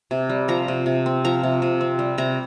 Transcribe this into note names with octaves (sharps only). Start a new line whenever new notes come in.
C3
G3
F3 A#5
C3
C3
C4
F3 A#5
C3
C3
C4
G3
C3 A#5